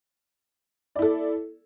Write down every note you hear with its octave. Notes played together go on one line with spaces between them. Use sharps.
E4 A4 D5